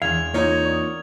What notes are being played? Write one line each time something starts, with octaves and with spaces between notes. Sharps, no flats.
E1 E2 E5 F5 F6 G#6 F7
A#3 C4 D#4 F4 C#5 A#5
D5 C#6 D#6